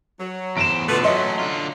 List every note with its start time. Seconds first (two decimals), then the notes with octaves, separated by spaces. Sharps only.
0.20 F#3
0.57 E2 C5 D7 E7
0.88 B2 D3 A3 F4 B4
1.03 F#3 A3 C#4 D#5 C6
1.39 D3 F4